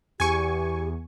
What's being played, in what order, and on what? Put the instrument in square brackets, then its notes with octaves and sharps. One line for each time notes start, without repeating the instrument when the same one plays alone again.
[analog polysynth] E2 [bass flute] G4 [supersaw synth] G#5 C#6